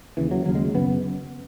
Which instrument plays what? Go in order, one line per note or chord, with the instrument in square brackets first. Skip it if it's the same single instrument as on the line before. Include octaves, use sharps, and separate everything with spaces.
[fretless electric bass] D#2 C#3 E3
F#3
D#2 C#3 F#3
G#3
F#2 C#3 B3